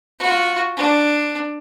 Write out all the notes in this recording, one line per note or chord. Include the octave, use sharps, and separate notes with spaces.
F4 F#4
D4